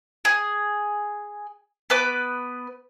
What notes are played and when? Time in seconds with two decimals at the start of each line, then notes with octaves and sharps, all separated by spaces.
0.25 G#4
1.90 B3 B4 D6